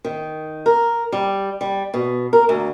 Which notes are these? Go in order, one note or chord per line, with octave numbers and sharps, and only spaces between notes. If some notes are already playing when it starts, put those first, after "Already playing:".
D#3
A#4
G3
G3
B2
A#4
D2